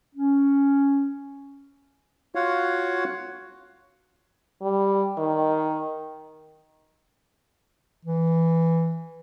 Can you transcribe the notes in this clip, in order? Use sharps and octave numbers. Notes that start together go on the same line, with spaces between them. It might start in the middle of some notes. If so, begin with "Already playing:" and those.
C#4
F4 F#4 C#5 F5 F#5
G3
D#3
E3